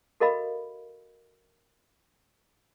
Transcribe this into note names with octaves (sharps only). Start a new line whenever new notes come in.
F#4 A4 A#4 D#5 F5 B5